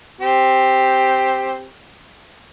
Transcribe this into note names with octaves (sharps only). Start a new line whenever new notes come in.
C4 G4